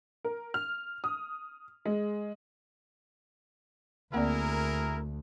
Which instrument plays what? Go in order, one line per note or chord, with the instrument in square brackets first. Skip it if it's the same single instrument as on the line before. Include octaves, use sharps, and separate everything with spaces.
[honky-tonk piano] A#4
F6
D#6
G#3
[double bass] D2 [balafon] A#3 C4 D5 [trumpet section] E4 G#4 A#4